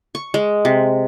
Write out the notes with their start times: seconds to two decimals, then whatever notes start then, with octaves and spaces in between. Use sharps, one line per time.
0.15 C#6
0.34 G#3
0.65 C3